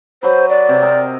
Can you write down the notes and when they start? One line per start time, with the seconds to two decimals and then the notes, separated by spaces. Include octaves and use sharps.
0.23 F#3 B4 C5
0.49 D5
0.69 C3
0.82 C4 A#4 D#5